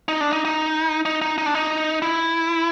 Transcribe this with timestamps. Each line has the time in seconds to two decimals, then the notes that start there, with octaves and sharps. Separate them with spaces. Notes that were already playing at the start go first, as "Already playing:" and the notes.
0.08 D#4
0.21 D4
0.33 D#4
0.45 D#4
1.05 D#4
1.22 D#4
1.38 D#4
1.46 D4
1.54 D#4
2.02 E4